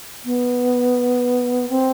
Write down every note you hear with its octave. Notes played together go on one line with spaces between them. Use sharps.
B3
C4